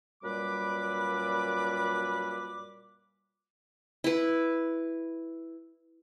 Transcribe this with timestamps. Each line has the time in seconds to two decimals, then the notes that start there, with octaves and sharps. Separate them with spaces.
0.22 F#2 A#2 G3 B4 D6
4.04 E4 B4